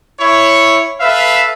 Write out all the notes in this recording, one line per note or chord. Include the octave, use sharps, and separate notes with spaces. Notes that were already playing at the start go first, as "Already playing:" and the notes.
E4 C#5
A4 B4 E5 F5